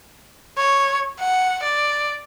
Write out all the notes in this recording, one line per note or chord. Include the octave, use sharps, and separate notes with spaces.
C#5
F#5
D5